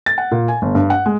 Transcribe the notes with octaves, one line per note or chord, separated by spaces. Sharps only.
A6
F#5
A#2
G#5
G1
G2
F#5
G#3